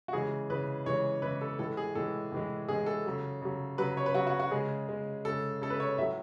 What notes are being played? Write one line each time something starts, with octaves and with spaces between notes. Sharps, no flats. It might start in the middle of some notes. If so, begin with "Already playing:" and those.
F#4
C#3 E3 G#3 G#4
C#3 E3 G#3 B4
C#3 E3 G#3 C#5
C#3 E3 G#3 B4
A4
A2 E3 G#3 A4
G#4
A2 E3 G#3 A4
A2 E3 G#3
A2 E3 G#3 G#4
A4
C#3 F#3
C#3 F#3
C#3 F#3 B4
C#5
B4
C#3 F#3 F#4
F#4
F#4
C#3 G#3 G#4
C#3 G#3
C#3 G#3 A4
C#3 G#3 A4
B4
C#5
A2 F#3 E5